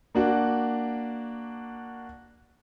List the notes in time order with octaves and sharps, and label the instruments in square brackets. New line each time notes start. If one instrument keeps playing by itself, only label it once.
[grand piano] A#3 D4 F#4